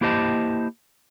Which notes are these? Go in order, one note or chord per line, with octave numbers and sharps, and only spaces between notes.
A#3 E4 G4 C5 D#5 A5